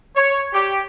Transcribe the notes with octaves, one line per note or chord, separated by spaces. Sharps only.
C#5
G4